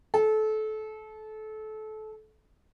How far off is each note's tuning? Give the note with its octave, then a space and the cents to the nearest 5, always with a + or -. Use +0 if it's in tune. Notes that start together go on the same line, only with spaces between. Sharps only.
A4 -25